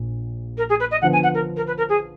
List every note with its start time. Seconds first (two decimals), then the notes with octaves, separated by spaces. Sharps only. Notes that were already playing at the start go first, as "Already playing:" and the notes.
Already playing: A#1 A#2
0.58 A#4
0.70 G#4
0.80 B4
0.91 D#5
1.02 D3 F3 B3 F#5
1.13 G#5
1.23 F#5
1.34 A#4
1.56 A#4
1.67 B4
1.78 A#4
1.89 G#4